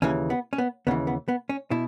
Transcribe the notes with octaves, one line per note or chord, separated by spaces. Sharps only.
D#2 C#3 E3 C#4
B3
C#4
B3
D#2 C#3 E3 B3
B3
B3
C#4
B2 E4